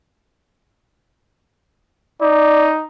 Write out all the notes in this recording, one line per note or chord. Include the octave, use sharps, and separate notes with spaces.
D#4 D5